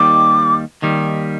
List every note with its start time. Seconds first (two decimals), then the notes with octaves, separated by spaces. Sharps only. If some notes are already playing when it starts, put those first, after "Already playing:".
Already playing: D#2 D#3 G3 D6
0.82 D#2 D#3 G3